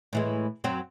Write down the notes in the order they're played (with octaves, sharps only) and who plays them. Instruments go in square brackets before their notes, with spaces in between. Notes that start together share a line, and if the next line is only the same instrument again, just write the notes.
[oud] A2 E3 G#3
F#2 F#3 C4